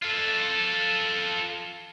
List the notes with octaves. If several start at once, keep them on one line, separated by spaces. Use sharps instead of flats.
F4 A4